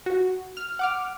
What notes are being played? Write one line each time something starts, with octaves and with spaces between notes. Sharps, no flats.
F#4
F6
F#5 D6 F6